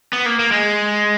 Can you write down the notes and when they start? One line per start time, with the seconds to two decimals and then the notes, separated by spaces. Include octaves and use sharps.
0.13 B3
0.26 A#3
0.39 A#3
0.52 G#3